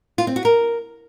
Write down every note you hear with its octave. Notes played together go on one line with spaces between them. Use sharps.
F4
C4
F#4
A#4